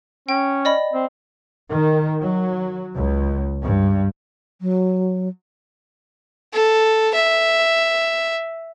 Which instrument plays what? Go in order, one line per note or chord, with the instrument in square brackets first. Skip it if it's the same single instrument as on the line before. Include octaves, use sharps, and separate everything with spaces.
[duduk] C#4 [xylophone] G5
[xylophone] D5 D#5 B5
[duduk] C4
[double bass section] D#3
F#3
C#2
G2
[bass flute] F#3
[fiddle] A4
E5